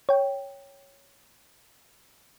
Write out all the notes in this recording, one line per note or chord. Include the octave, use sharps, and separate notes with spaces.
C#5 G5